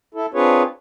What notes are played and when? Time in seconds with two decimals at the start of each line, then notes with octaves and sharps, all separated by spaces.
0.14 E4 A4
0.34 C4 D4 F4 G#4 B4 C#5